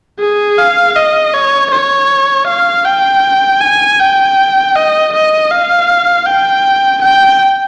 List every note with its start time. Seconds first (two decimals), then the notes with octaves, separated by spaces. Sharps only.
0.20 G#4
0.58 F5
0.96 D#5
1.34 C#5
1.71 C#5
2.48 F5
2.85 G5
3.61 G#5
4.00 G5
4.76 D#5
5.13 D#5
5.51 F5
6.27 G5
7.03 G5